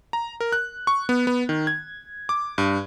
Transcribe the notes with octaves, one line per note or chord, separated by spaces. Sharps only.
A#5
A#4
F#6
C#6
B3
B3
D#3
G#6
D6
G2